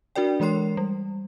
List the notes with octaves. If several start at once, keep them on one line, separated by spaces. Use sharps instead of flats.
D4 F#4 A#4 D5 G5
E3 G#3 A#4 C#5 C6 C7
G3